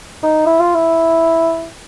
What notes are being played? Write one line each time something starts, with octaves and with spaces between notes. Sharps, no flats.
D#4
E4
F4
E4